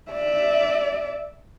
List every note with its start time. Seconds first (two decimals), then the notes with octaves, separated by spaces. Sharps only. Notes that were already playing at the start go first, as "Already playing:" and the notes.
0.11 D5 E5